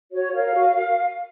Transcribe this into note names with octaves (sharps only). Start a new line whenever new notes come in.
F#4 C#5
A#4 C#5 F5
F#4
A#4